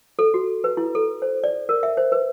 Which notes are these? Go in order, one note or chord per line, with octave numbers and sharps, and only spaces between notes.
A4
F#4
B4
E4
A4
C5
D5
A#4
E5
C5
B4